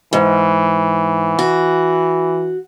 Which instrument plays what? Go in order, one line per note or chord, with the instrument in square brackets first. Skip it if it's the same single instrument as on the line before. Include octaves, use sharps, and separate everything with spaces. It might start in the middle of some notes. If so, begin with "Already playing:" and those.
[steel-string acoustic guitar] G#2 [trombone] E3
[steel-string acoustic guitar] F#4